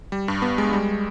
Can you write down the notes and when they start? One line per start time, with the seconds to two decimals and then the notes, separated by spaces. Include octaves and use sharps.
0.12 G3
0.28 G2
0.42 B3
0.58 G#3
0.73 G3